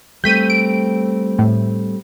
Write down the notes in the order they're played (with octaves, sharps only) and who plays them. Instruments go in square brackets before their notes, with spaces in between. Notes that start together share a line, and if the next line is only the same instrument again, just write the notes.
[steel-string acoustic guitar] G3 A3 C4 [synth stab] G6 B6 D#7
[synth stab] D7
A2